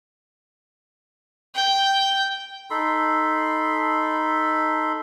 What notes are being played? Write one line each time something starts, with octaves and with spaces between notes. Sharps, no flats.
G5
D#4 A4 B5 C6